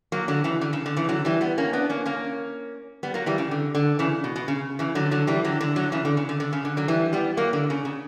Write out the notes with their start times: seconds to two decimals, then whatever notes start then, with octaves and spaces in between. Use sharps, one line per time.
0.12 F#3 A#3
0.28 D3 F#3
0.44 C#3 E3
0.61 D3
0.73 C#3
0.86 D3
0.97 C#3 E3
1.09 D3 F#3
1.25 E3 G3
1.41 G3 B3
1.58 A#3 C#4
1.73 B3 D4
1.89 A#3 C#4
2.06 A#3 C#4
3.03 G3 B3
3.14 F#3 A#3
3.26 E3 G3
3.38 C#3
3.51 D3
3.75 D3
3.99 C#3 E3
4.24 B2
4.36 B2
4.48 C#3
4.79 C#3 E3
4.95 D3 F#3
5.11 D3 F#3
5.27 E3 G3
5.45 D3 F#3
5.61 D3
5.76 D3 F#3
5.92 C#3 E3
6.05 D3
6.17 C#3
6.29 D3
6.40 D3
6.53 C#3
6.65 D3
6.77 D3 F#3
6.88 E3 G3
7.13 G3 B3
7.37 F#3 A#3
7.53 D3
7.70 C#3
7.85 C#3